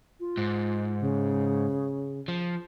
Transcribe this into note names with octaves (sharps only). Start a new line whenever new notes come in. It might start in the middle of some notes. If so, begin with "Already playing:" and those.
F4
G#2
C#3
F3